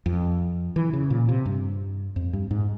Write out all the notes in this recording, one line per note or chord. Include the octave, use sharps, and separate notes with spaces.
F2
E3
C#3
A#2
C3
G2
F2
G2
G#2